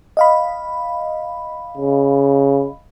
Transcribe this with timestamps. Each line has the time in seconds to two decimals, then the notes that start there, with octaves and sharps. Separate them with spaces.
0.17 D#5 F5 B5
1.78 C#3